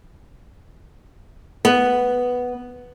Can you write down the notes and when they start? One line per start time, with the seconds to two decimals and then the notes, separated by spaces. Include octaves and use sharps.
1.65 B3